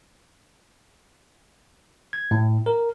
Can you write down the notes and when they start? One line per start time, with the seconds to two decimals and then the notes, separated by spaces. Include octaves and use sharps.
2.13 G#6
2.31 A2
2.66 A#4